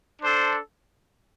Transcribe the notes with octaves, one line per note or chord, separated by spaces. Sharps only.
D4 A4 C5